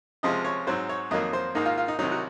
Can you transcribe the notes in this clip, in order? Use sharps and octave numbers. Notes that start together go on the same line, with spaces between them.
C#2 C3 F3 G#3 D#5
C#5
G#2 F#3 C4 C5
C#5
F2 D#3 F#3 A#3 D#5
C5
G#2 D#3 A#3 D#4
F4
F4
D#4
C2 C3 D#3 F#3 D#4
F#4